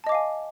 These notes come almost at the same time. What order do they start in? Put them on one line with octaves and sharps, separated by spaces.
A5 D#5 D6 F5 G#5